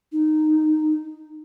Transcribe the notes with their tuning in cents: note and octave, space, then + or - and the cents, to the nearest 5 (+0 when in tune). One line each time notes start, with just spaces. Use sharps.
D#4 -10